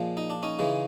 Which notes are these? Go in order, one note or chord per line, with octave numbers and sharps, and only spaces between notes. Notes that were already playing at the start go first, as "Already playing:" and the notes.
Already playing: A#2 F3 G#3
D#4
D4
C#4 D#4
C#3 E3 G#3